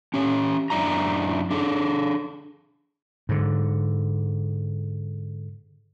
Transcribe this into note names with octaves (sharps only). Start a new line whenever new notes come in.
C#4 G4 C#5
F#2 D4 E4 A#5
D4 G#4 A4
G#2 D3